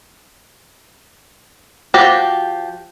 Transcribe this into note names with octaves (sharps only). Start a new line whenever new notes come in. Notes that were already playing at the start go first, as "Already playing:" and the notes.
F3 F#4 G4 G5